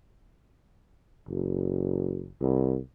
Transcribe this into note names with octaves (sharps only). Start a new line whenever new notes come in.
F#1
C2